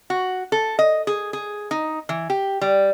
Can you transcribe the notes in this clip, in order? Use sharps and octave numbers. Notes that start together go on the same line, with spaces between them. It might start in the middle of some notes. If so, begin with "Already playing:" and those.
F#4
A4
D#5
G#4
G#4
D#4
E3
G4
G3